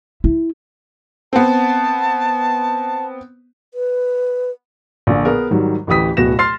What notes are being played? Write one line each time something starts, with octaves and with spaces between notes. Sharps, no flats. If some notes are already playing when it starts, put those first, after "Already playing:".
E4
B3 C4 A5
B4
A#1 A#2 D3
B3 G#4 A#4
G#2 D#3 F#3 G3
A1 D2 E3 G4 D#6 B6
D1 B2 B3 F#4 A#6 E7
C6 F6 A6 C7